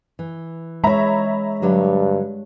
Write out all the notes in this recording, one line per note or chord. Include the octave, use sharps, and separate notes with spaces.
E3
G#3 C#5 E5 A#5 B5
G2 D3 F#3 G3